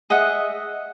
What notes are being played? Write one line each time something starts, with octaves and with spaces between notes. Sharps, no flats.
G#4 D#5 E5 F#5